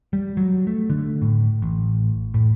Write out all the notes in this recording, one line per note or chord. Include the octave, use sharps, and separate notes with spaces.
G3
F#3
A3
D3
A2
A1
A2